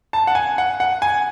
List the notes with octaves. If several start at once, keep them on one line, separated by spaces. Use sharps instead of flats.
A5
F#5
G#5
F#5
F#5
G#5